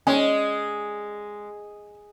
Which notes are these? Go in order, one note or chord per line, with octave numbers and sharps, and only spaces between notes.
G#3 C#4 D#5